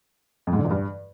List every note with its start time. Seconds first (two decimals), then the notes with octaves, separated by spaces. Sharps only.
0.47 F2
0.53 G#2
0.59 D3
0.65 E2
0.70 G2